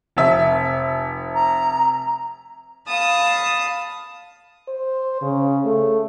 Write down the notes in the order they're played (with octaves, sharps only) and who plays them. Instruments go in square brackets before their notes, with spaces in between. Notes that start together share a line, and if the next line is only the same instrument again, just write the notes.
[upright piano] F1 E5
[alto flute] A#5
[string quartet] F5 A5 B5 D#6
[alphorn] C5
C#3
A3